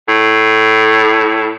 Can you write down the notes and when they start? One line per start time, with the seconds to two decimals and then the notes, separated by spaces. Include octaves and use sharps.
0.09 A2